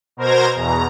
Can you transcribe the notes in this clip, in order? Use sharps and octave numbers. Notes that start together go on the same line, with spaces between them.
B2 A#4 C5 A#5 G#6 A#6
E2 B2 A#5